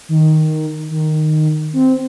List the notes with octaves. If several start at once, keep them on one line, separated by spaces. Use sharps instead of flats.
D#3
D#3
C4